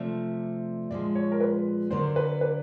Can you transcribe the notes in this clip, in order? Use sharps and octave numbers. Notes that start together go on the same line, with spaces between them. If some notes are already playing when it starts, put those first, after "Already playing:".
Already playing: C3 F3 A3 D5
A#2 F3 G#3 D5
C#5
A#4
B4
D3 F#3 A#3 D4 C5
B4
B4